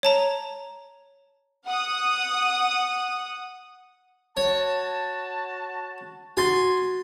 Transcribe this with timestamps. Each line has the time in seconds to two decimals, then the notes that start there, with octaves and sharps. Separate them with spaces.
0.03 C#5 A5 A#5
1.64 F#5 D#6
4.37 F#4 C#5 A5
6.37 F#4 G#5 C6 A6